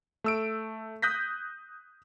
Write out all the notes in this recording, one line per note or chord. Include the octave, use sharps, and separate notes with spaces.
A3 E6 D7
D#6 F#6 G6 A#6 B6